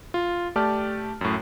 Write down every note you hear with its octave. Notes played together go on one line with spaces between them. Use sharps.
F4
A3 G4 D5 A5 F6
F#2 A2